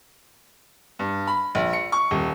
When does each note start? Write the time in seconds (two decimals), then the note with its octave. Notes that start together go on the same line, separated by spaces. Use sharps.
0.99 G2
1.27 B5
1.55 A#1
1.73 C#7
1.92 C#6
2.11 D#1